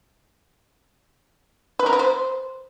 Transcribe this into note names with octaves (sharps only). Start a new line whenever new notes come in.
B4
A#4
B4
C5